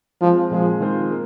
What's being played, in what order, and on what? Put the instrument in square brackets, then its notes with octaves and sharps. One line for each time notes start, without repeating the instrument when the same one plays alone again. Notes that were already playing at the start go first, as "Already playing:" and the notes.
[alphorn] F3 [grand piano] G#3 C4 F4
[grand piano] A#2 G#3 C4 G#4 [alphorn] F3
[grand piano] D#3 G#3 C4 F4 C5
A#3